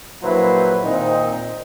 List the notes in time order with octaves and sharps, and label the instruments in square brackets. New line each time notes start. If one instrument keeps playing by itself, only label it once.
[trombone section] A#1 F#3 A#3 E4 B4 C5
A#2 D#3 C4 D#4